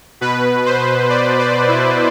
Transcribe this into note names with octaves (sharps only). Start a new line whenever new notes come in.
B2 B4
C5
D5
D5
E4